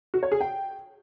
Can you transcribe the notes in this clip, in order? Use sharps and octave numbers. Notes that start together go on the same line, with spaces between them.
F#4
C#5
G#4
G5